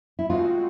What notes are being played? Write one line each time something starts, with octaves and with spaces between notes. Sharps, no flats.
E4
D#3 G#3 C4 D#4 F4 F#4